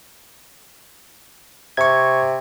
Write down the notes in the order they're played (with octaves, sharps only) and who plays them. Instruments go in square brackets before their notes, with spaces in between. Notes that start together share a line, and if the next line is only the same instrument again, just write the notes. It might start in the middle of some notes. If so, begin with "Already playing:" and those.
[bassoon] C3 [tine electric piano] C#6 G#6